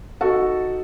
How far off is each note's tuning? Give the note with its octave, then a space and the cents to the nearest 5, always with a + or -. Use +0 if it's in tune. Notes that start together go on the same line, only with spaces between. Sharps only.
D#4 +0 F#4 +0 A4 +0